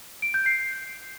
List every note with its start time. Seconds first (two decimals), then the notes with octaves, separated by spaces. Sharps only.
0.22 D7
0.34 G6
0.46 C7